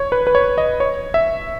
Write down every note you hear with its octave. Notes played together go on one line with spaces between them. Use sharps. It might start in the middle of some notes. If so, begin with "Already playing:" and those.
Already playing: C#5
B4
B4
C#5
D#5
C#5
E5